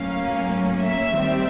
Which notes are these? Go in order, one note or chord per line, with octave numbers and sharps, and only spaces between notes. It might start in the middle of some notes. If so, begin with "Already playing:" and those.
Already playing: A2 F#3 A#3 C#4 F5
E5
D#3 G3 C4